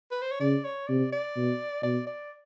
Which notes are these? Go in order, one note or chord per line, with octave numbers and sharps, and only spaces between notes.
B4
C5
C#5
C#3 D5
C#5
C3 D5
D5
B2
B2 D5
D5